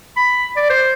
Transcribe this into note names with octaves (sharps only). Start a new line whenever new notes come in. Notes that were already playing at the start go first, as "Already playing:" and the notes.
B5
D5
C5